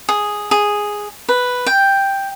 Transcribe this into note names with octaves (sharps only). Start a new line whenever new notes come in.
G#4
G#4
B4
G5